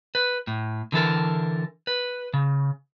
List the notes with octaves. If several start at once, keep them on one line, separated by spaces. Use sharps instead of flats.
B4
A2
D3 E3 A4 A#4
B4
C#3